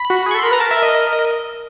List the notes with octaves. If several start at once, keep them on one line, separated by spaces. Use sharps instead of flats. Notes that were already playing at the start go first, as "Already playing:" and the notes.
Already playing: B5
F#4
G#4
C#6
A4
C6
A#4 B5
B4 A#5
A#4 A5
E5
D#5